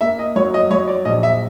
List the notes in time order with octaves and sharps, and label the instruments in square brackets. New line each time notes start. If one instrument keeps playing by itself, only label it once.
[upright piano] A#3 E5
D#5
F#3 C#5
D#5
F#3 C#5
D5
A#1 D#5
E5